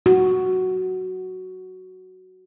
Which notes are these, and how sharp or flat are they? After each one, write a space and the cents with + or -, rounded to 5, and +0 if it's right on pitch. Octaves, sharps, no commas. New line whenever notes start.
F#4 +5